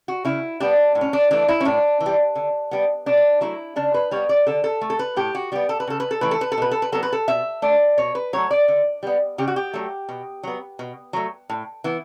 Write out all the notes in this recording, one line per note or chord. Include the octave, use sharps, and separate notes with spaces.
F#4
C#3 E4
G3 B3 D4
A2
C#4
D4
E3 A3 D4
E4
C#4
A2 D4
E3
G3
D3
G3 B3
B2 D4
F#3 A3 E4
C#3 D4
B4
G3 B3 C#5
D5
D3 A4
A4
A3
A4
B4
A2 G4
F#4
G3 B3 G4
A4
B4
C#3 A4
B4
A4
E3 A3 B4
A4
B4
A4
B2 B4
A4
B4
F#3 B3 A4
B4
A4
B2 E5
A3 D5
B2 C#5
B4
F#3 A3 C#5
D5
D3
G3 B3
C#3 G4
F#4
G4
F#3 A3
B2
F#3 B3
B2
F#3 A3
A2
E3 B3